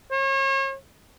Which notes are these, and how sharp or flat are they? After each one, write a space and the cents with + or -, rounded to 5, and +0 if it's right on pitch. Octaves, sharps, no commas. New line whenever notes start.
C#5 -40